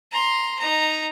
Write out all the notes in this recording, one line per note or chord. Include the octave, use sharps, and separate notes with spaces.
A#5 C6
D#4 A#5